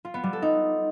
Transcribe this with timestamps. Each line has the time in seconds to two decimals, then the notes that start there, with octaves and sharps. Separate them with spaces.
0.05 F4
0.14 B3
0.23 G3
0.33 A4
0.42 D#4